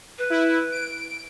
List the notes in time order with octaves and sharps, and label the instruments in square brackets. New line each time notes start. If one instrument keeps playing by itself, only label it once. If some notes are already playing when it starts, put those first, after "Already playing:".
[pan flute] B4
[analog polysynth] E4
D7